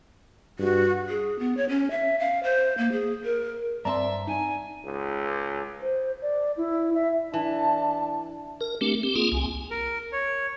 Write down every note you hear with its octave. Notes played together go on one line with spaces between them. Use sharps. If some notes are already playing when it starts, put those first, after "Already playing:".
G2 F#4
G#4
B3
C#5
C#4
E5
F5
C5
A#3
G#4
A#4
G2 C4 D5 E5 A5 A#5 C6
D#4 G#5
C#2
C5
D5
E4
E5
E3 D4 A5
A#4
A3 C4 D4 G4
C4 G4
A#3 C4 F4 G#4
C2 G#5
A#4
C#5